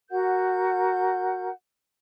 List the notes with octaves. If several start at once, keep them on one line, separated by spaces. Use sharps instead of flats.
F#4 A#4 F#5 G6